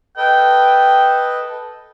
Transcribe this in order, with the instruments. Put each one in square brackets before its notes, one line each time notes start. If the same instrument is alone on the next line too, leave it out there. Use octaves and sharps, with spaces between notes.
[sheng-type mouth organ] A4 B4 D#5 [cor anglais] G5